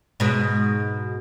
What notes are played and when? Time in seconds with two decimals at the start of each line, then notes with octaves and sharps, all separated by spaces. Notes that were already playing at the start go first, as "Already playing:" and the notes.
0.20 G#2 B2